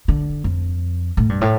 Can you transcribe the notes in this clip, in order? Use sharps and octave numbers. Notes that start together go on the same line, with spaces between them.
D3
F2
A2
G2
A2